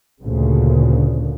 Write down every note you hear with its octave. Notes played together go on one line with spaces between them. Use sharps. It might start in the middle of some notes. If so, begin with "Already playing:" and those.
D2 A#2 C#3